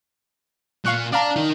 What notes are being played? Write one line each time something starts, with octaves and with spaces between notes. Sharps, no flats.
A#2 F5 C#6 F#6
D4 D5 F5 A5 A#5
D#4 A#4